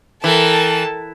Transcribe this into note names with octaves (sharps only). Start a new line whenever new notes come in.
E3 A4 A#4 G5 A5